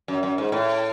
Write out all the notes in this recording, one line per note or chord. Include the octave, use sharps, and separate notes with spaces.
F#2
F#2
G#2
A2